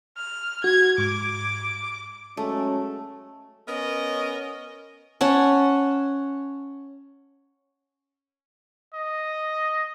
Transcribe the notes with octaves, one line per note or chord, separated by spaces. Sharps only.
F6
F#4 G#6
G#2 D6
F#3 G#3 A3 C#4
B3 C#4 A#4 D#5
C#4 F#5 A5
D#5